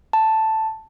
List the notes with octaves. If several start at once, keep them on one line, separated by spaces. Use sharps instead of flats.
A5